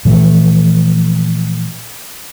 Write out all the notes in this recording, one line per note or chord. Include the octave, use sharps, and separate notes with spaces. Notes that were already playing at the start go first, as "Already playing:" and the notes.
A#2 E3 F3 A3